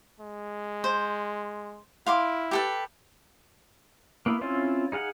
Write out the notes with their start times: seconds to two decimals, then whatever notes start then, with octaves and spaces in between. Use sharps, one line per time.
0.20 G#3
0.84 C5
2.06 E4 F5 C6 D6
2.51 G4 A4 B4
4.26 A#3 B3 E4
4.41 C4 C#4 E4 F4
4.92 D#4 G#4 F5 F#5